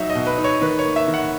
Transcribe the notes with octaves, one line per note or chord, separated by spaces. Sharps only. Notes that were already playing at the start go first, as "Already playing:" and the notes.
Already playing: F#3 D#4 E5
D#5
B2
B4
D#4
C#5
D#3 B4
C#5
A#3
E5
D#3
F#5